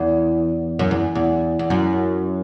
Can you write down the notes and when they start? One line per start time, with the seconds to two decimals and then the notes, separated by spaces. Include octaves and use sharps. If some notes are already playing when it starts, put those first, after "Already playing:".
Already playing: E2
0.79 F#2
0.91 E2
1.15 E2
1.59 E2
1.70 F#2